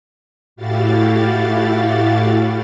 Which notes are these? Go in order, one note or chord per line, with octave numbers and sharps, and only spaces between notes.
A2 E4 F#4 G4 F5 A6